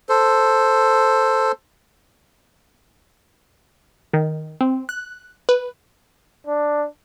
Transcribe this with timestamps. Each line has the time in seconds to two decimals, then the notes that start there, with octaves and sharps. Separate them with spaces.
0.09 A4 C5
4.13 D#3
4.61 C4
4.89 F#6
5.49 B4
6.47 D4